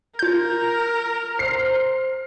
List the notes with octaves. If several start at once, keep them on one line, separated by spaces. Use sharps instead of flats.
F4 A#4 G6
C5 F6 C7